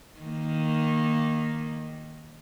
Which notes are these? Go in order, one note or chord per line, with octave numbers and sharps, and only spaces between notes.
D#3 A#3